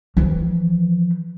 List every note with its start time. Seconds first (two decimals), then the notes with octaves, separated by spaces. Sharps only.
0.17 E3 F3